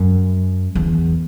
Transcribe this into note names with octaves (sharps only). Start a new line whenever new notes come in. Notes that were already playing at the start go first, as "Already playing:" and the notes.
Already playing: F#2
E2